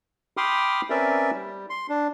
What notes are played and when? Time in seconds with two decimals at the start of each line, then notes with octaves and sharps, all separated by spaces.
0.37 G5 B5 C6 D6 D#6 F6
0.90 C4 C#4 A#4 B4 D5 E5
1.34 G3
1.70 C6
1.89 D4